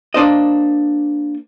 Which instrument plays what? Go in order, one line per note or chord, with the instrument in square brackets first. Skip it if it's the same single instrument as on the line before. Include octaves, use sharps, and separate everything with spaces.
[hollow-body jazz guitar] A#3 D4 C5 D#5